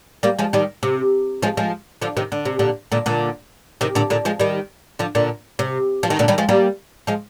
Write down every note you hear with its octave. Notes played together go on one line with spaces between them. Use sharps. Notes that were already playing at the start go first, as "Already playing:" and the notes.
G3 A#3
F3 G#3
D#3 G3
C3
F3 G#3
F3 G#3
D3 F3
C3 D#3
D3
C3
A#2 D3
A#2 D3
A#2 D3
C3 D#3
A#2 D3
A#2 D3
F3 G#3
D#3 G3
D3 F3
A#2 D3
C3
F3
D#3
A#2 D3
D#3 G3
F3 G#3
G3 A#3
F3 G#3